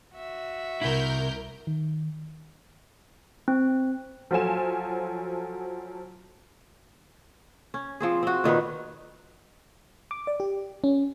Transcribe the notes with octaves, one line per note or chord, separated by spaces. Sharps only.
F#4 E5
C2 C3 E4 A#4 G6
D#3
C4
F3 F#3 F4 A4 G#5 E7
C#4
F3 C4 G#4
C4 F#4
A#2 D#3 D#4 B4
D6
D5
G4
C#4